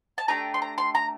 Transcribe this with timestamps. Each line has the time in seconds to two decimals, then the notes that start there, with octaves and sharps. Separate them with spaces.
0.18 A5
0.28 A3 D4 G4 A#5
0.54 C6
0.62 A#5
0.78 C6
0.95 A#5